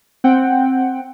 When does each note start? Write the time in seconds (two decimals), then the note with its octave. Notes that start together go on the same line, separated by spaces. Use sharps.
0.24 C4 F#5 G5